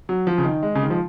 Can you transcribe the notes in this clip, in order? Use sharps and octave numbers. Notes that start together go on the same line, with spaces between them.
F#3
F3
C#3
D#3
G#3
C#3
D#3
F3